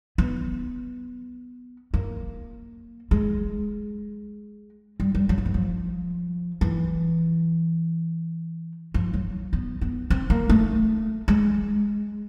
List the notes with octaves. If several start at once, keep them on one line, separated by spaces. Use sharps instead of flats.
B3
A#3
G#3
G3
G3
F#3
F3
E3
F3
E3
F3
F#3
B3
B3
C4
A#3
A3
G#3